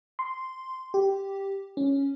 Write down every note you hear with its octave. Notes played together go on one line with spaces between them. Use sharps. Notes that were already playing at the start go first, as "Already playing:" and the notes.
C6
G4
C#4